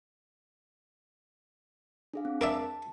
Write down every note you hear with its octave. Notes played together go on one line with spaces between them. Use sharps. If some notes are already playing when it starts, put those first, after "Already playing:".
D4 G#4 F5
C4
A#4 D5 E5 A5